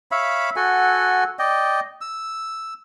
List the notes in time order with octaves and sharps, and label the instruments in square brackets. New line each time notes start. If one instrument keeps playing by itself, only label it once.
[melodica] C#5 E5 F5 B5
F#4 A4 F#5 G#5
D5 D#5 G5
E6